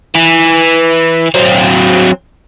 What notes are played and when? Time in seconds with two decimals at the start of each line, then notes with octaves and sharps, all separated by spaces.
0.15 E3
1.35 F#3 C4